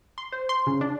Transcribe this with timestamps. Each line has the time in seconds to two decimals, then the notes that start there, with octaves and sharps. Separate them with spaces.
0.18 C6
0.32 C5
0.49 C6
0.67 C#3
0.81 D4